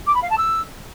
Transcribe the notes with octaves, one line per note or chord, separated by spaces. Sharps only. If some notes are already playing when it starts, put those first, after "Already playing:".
D6
B5
F5
A5
E6